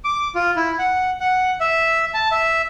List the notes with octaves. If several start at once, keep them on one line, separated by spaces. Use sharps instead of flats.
D6
F4
E4
F#5
F#5
E5
A5
E5